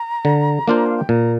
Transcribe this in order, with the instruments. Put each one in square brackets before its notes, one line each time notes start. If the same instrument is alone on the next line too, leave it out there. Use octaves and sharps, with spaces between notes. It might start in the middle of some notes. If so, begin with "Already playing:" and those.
Already playing: [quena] A#5
[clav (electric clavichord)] D3
A#3 D4 F4 C5
[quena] F5
G5
[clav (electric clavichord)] A#2 [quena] A#5